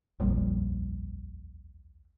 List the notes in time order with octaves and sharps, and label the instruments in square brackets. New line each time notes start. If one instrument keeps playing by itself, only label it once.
[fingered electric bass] D#1 A#1 F2 G3